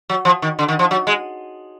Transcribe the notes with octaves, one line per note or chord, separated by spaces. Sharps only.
F#3
F3
D#3
D3
D#3
F3
F#3
G#3